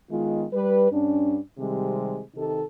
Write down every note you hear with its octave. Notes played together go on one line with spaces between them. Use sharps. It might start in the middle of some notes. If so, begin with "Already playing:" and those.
D#3 G#3 B3 F4
G3 B4
G2 C#4 D4
C3 D#3 G3 G#3 C4
C3 D#3 D#4 G4 A4